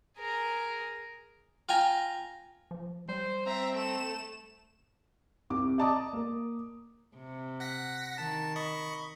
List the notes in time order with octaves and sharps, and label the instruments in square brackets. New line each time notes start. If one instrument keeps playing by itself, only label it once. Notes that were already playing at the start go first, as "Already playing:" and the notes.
[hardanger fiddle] G#4 A#4
[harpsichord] F4 G5 G#5 A#5
[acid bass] F3
[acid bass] G3 [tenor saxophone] C5
[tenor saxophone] C4 [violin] E5 A#5
[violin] A3 E7
[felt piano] C2 C3 D6
D5 D#5 A5 A#5 D6 D#6
A#3 A#4
[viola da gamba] C3
[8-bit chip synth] F#5 A#6 B6
[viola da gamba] D#3 [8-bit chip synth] A5
[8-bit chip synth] D#5 B5 C#6